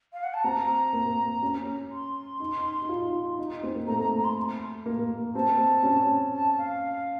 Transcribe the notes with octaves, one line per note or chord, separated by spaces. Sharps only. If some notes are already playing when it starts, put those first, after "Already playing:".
F5
F#5
A5
C4 A#5
A#3
C#4
C6
D#4
D#4
F4
D#4
C4
A#3
A3 A#5
A#5
A#5
C6
A#3
C4 A5
C#4
A5
F5